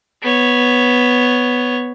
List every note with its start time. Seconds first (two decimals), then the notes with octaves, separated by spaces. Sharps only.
0.22 B3 C#5